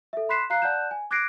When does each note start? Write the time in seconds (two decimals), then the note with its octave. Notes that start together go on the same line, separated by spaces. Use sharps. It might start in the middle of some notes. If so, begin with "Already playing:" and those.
0.13 A4 E5
0.29 B5 C6 F#6 B6 C7 E7
0.50 F5 A#5 F#6 C7
0.62 D5 F#5 A5 F#6 G6 E7
0.91 G#5
1.11 D6 F#6 G#6 A#6 C7 D7